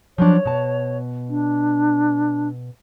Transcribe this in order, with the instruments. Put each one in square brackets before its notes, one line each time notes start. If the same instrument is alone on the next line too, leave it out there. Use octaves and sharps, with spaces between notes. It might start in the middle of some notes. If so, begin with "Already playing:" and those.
[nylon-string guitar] F3 F#3 D4 [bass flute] C#5
[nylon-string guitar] B2 A5
[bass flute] D4